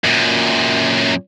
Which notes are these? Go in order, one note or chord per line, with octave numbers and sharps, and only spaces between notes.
F#2 A#2